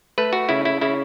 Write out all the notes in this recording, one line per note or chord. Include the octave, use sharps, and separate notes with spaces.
A3 B4
F#4
C#3 E4
E4
C#3 E4